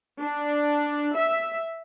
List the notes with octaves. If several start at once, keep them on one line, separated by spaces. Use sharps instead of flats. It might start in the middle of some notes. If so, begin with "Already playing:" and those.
D4
E5